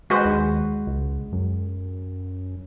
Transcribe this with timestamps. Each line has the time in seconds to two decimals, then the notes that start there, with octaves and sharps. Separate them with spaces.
0.10 G#3 F#4 B4 C5
0.25 D#2
0.87 C#2
1.33 F#2